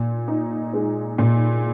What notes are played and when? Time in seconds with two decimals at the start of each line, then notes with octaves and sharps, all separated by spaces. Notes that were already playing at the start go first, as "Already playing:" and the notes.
Already playing: A#2
0.28 D#4
0.73 G#3
1.18 A#2